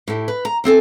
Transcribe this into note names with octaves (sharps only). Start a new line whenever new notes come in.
A2 E4 G4
B4
A#5
E2 C4 A4 G#5